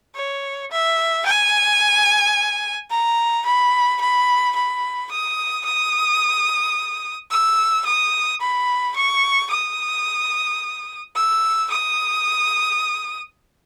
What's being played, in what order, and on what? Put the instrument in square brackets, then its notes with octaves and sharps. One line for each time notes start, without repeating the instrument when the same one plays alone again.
[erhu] C#5
E5
G#5
A#5
B5
B5
B5
D#6
D#6
E6
D#6
B5
C#6
D#6
E6
D#6